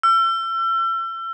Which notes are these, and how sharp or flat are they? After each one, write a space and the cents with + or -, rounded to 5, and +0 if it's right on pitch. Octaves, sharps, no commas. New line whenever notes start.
E6 +35